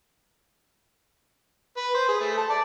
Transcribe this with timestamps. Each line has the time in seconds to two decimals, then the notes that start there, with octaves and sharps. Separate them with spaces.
1.77 B4
1.94 C5
2.08 G#4
2.20 A3
2.37 A5
2.50 D5